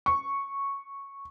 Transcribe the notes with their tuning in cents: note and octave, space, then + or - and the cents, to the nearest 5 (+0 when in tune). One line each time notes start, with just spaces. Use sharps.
C#6 -5